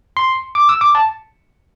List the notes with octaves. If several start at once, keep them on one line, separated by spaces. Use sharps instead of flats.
C6
D6
E6
D6
A5